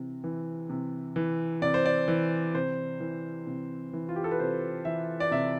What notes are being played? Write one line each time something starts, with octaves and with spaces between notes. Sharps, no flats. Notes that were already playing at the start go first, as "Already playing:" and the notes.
Already playing: C3 E3
E3
C3
E3
C3 D5
C5
D5
E3
C3 C5
E3
C3
E3
F4
G4
A4
B4
C3 C5
E3 E5
D5
C3 E5